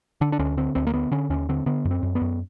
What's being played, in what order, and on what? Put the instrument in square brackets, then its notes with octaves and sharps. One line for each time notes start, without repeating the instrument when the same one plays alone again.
[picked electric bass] D3 D4
D4
D2 C#4
D3 C4
D2 C4
A#3
D3 B3
D3 C#4
D#2 C#4
D3 C4
D3 B3
F#2
C4
F#2
B3
F#2